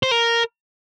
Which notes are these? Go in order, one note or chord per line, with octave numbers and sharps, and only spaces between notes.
C5
A#4